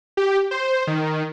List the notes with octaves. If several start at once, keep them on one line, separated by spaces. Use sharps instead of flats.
G4
C5
D#3